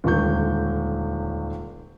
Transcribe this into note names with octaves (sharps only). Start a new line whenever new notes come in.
D#1 C#2 D3 C#6 G6